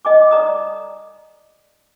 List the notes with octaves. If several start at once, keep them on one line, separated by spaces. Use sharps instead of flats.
D#5 G#5 D6
D5 A#5 D#6